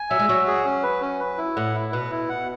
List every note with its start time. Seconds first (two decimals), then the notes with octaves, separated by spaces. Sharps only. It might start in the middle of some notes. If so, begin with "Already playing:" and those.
Already playing: G#5
0.10 F#3 E5
0.19 G#3
0.29 F#3 F#4
0.47 G#4
0.65 C#4
0.83 B4
1.02 C#4
1.19 B4
1.38 E4
1.56 A2 F#5
1.74 E4
1.93 B2 B4
2.11 E4
2.29 F#5